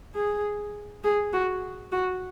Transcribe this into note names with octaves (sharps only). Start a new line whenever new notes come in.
G#4
G#4
F#4
F#4